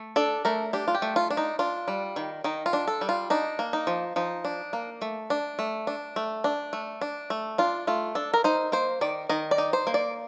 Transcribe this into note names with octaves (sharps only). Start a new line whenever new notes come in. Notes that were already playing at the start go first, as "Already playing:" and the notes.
Already playing: A3
D4 A4
A3 A#4
D4 G4
F4
G4
A3
F4
D4
D#4
D4 F4
G3
D#3
D#3 D#4
F4
D4
A4
G3
F4
D4 D#4
A#3
D#4
F3
F3 D#4
D4
A#3
A3
D4
A3
D4
A3
D4
A3
D4
A3
D4 F4
A3 F4
D4 A4
A#4
D#4 C5
A#3 C5
D#3 D5
D#3 D#5
D5
D#4
C5
A#3
D5